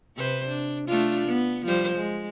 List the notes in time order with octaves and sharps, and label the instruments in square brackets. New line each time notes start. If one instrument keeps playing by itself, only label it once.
[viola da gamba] C3 B4 C5
D4
A3 D4 F4
B3
F3 G3 C5
G#3